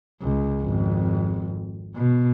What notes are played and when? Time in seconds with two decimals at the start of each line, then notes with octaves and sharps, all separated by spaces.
0.22 C#2
0.62 G#1 F2
1.96 B2